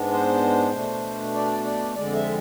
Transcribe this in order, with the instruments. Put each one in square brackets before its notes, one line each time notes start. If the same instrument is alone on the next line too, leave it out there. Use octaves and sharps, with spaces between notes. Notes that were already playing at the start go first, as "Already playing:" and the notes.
Already playing: [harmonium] G#2 G#3 B3 D4
C5
B2 A3 D4
D5
D5
F2 D3 G#3 D5
E5